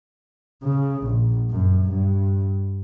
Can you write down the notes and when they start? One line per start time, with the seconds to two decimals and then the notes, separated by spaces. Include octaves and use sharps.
0.64 C#3
1.05 A#1
1.51 F#2
1.89 G2